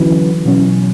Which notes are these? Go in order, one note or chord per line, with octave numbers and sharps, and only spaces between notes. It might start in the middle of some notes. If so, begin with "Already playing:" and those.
Already playing: D3 E3 F#3 C#4 F#4 B4
B2 F#3 C#4